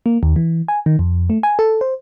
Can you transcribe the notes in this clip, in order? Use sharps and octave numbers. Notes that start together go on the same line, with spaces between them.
A#3
D#2
E3
G#5
D#3
F2
A3
G#5
A4
C5